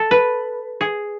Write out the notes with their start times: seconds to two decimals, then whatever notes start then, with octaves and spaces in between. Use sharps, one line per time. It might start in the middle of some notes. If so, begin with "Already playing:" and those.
Already playing: A4
0.11 B4
0.81 G#4